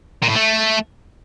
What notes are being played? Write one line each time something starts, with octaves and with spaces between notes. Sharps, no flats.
A#2
A2
A3